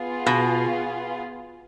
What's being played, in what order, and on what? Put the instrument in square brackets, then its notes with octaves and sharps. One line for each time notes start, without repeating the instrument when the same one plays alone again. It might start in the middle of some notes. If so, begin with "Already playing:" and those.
Already playing: [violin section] B3 F4 G#4
[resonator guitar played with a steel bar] B2